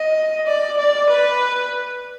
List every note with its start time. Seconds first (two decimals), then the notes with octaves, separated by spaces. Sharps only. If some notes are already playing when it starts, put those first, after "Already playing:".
Already playing: D#5
0.47 D5
0.78 D5
1.10 B4